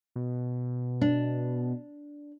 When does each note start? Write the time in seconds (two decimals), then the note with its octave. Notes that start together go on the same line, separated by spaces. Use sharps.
0.16 B2
1.01 D4